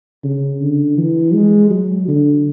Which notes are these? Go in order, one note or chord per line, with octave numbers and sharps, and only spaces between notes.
C#3
D3
E3
G#3
F#3
D3